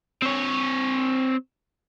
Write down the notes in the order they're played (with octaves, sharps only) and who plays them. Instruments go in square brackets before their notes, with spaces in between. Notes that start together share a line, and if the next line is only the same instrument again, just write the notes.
[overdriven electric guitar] C4 C#5